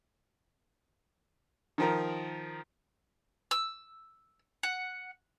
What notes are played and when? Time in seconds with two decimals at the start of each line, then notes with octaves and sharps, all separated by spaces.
1.78 D#3 F3 A#4
3.51 E6
4.63 F#5